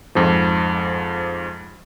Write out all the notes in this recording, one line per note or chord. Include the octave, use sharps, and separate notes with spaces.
F2 G#2 F3